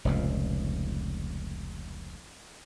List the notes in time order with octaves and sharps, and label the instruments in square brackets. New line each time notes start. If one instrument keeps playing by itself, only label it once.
[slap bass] F1 C#2 A#2